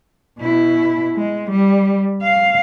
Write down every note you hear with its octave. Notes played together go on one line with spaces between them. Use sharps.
B2 E4
G#3
G3
F5